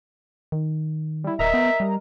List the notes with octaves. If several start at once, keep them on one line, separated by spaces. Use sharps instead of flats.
D#3
G3 E4
D1 A#4 D#5 E5 A#5
B3
G3